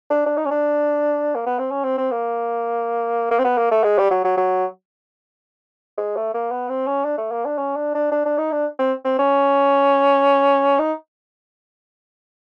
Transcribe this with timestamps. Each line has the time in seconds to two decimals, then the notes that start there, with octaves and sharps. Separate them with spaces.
0.10 D4
0.26 D4
0.37 D#4
0.46 C#4
0.51 D4
1.35 A#3
1.46 B3
1.59 C4
1.71 C#4
1.84 C4
1.98 C4
2.12 A#3
3.31 A#3
3.39 C4
3.44 B3
3.58 A#3
3.71 A3
3.84 G#3
3.98 G3
4.11 F#3
4.25 F#3
4.37 F#3
5.98 G#3
6.16 A3
6.34 A#3
6.51 B3
6.69 C4
6.87 C#4
7.05 D4
7.18 A3
7.32 A#3
7.45 D4
7.58 C#4
7.76 D4
7.95 D4
8.11 D4
8.26 D4
8.38 D#4
8.52 D4
8.79 C4
9.05 C4
9.19 C#4
10.79 D#4